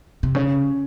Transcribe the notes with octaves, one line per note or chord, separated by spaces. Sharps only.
C3
C#3 C#4